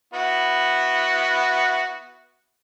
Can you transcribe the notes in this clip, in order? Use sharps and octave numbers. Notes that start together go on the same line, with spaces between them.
B3 E4 F#4